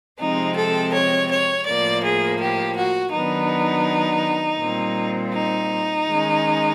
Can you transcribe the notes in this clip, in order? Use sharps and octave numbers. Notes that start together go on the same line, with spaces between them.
C3 F3 G#3 C4 D#4
A4
C#5
C#5
A2 F3 A#3 D5
G#4
G4
F#4
D#3 F#3 B3 D4 D#4
A#2 G3 C4
D#4
D#3 G#3 C#4